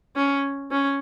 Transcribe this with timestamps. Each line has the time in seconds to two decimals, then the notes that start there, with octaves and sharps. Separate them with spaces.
0.16 C#4
0.71 C#4